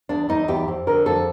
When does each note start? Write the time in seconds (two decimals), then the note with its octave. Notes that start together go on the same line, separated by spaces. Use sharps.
0.09 E2 D4
0.29 E2 D#4
0.48 E2 G4
0.68 F2
0.87 D3 A#4
1.06 F2 A4